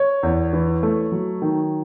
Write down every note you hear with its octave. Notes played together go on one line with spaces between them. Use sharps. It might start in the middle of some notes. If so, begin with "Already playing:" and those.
Already playing: C#5
E2
E3
A3
F#3
D#3